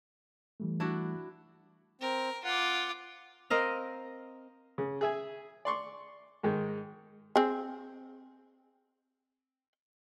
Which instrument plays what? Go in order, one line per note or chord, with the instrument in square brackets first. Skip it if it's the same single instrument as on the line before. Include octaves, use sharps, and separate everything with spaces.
[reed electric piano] E3 G3 A3
[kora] D4 E4 F#4
[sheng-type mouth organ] C4 [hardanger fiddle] A#4
[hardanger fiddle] F4 D6 [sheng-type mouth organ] F#5
[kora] C4 A#4 D#5 F5
[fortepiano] C#3
G#4 E5 G#5
D5 C6 C#6
G#2 D#3 G#3
[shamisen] C4 G#4